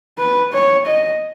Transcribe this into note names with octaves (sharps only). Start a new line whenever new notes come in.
B4
C#5
D#5